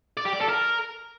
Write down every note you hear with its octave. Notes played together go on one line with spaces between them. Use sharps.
D5
G4
D5
A4
A#4